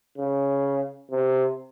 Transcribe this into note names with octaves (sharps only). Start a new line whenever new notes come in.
C#3
C3